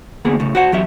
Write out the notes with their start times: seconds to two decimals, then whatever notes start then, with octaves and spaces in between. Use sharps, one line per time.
0.25 D2 A#3 B3 G#4
0.40 A2 C#3
0.55 F#4 C5 F#5
0.72 E2 F#3 G4 E5